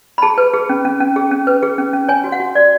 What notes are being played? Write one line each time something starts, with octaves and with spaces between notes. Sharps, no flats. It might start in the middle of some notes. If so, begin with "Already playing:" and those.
B5
G#4 A5
B4
G#4
C#4
C#4
C#4
G#4
C#4
B4
G#4
C#4
C#4
C#5 G#5
F#4
F#5
F#4
F#4 D5